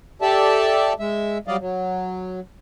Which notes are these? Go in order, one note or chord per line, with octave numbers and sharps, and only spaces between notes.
G4 A4 D5 E5 A5
G#3 E5
F#3 G3 D5 D#5 F5
F#3